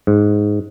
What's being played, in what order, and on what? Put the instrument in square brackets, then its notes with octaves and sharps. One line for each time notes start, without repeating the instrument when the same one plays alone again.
[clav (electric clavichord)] G#2